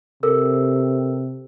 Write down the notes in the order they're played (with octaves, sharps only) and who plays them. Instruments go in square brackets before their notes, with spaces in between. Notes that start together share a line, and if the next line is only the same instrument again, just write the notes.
[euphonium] C3 [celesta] A4 A#4 E6